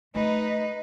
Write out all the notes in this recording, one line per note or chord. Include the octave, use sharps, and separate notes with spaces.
A3 D#4 B4